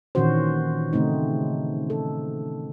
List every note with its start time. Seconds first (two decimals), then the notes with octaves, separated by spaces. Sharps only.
0.15 A#2 D#3 E3 C#4 F#4 C5
0.93 C#3 A3 C4 D#4
1.90 A4